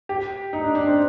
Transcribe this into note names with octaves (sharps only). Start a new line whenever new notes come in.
G4
D#4
D4
D4
C4